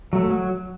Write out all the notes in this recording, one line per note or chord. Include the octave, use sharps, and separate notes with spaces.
F#3 A3
F#3